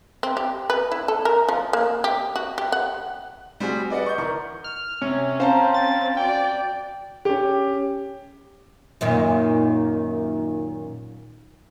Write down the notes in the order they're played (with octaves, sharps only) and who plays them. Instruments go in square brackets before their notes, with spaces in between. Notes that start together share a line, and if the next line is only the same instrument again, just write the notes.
[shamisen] C4
G4
B4
E4
A4
A#4
F3
A#3
G4
F#4
G4
F#5
[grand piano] G3 C4 F#4 G#4
B4 D5 D#5 F#5
C#6 G6
E3 A#4 C#6
[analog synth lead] F6
[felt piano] C3 [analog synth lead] C#4
[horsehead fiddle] C4 C#4 [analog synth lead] C5 [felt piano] F5 A5 A#5
[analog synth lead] A6
[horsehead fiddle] F#4 D5 [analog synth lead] G5
[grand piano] C#4 G4
[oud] F#2 A#2 D#3